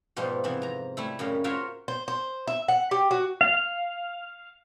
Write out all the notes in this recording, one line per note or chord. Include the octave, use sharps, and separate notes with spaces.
G#2 B2 F3 G3 D#4
C3 E3 F3 B3
F2 A#5
G3 A3 E4
F#2 A2 C#3 G3 A#3 C#4
F4 F#4 A#4 C5 C#5 E5
C5
C5
E5
F#5
G4
F#4
F5